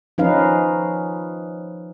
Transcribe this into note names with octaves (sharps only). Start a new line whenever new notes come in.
F3 C#4 D#4 B4 F5